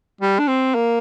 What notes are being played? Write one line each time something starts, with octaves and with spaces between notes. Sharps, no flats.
G3
D4
C4
A#3